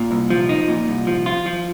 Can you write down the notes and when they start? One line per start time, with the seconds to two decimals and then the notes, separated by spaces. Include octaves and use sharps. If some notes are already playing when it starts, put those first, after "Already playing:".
Already playing: A#2
0.11 C2
0.30 F3
0.49 D#4
0.68 A#2
0.88 C2
1.07 F3
1.26 F4
1.46 F3